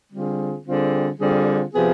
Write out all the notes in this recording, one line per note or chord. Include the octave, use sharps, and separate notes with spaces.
D3 G3 C4 F4 G#4
D3 G3 C4 F4 G#4
D3 G3 C4 F4 G#4
C3 F3 B3 F4 G#4